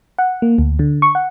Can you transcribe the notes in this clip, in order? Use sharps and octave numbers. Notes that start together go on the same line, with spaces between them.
F#5
A#3
D2
D3
C#6
F#5